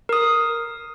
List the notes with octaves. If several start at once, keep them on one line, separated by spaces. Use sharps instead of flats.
A#4 D#6